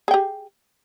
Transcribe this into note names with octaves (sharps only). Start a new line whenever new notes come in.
G4 G#4 G5